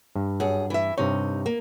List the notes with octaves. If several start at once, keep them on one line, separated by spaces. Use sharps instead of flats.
G2
F#2 G#4
E3 E5
G2 C3 D#4 C#5
A#3